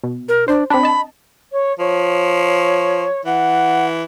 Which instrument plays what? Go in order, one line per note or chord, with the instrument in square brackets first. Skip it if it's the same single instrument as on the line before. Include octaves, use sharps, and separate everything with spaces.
[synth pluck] B2
[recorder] A#4
[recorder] D4 [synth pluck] C5
[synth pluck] C4 D4 [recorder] B5
[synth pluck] D#5 A5
[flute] C#5
[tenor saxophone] F3 [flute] C#5
[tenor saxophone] E3 [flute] F#5